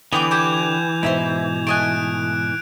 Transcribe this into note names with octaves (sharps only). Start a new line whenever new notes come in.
D3 E3 B3 G5 D6 F7
G4 D6 G6 G#6 E7
G#2 B2 D#4 C5 E5 B5
A3 D#5 G#5 F#6 D7